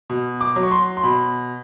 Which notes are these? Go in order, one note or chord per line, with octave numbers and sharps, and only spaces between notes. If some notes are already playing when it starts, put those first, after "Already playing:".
B2
D6
F#3
C#6
C6
C6
B2 B5